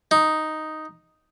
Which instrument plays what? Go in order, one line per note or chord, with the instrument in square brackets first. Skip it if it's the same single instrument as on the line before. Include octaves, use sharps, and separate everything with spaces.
[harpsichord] D#4